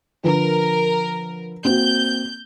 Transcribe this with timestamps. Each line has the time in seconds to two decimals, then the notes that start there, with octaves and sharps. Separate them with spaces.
0.23 D3 F3 A#4 B4
1.65 A#3 C4 F#4 G6